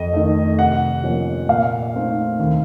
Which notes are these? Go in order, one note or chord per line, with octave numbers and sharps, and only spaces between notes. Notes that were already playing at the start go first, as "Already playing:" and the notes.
Already playing: F2 D#5
D#3 A3
C3 F#5
F3 A#3 C#4
A#2 F5
A3 C4 D#4
D#2